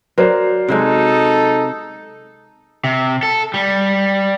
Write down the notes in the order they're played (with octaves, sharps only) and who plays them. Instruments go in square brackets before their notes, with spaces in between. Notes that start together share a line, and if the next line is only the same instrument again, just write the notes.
[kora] F#3 [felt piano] A#4 C5 D5
[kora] C3 F#3 G#3 [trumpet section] D#4 A4
[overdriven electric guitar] C3
A4
G3